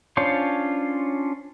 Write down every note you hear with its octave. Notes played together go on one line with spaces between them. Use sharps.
C#4 D4 F4 C5 C#5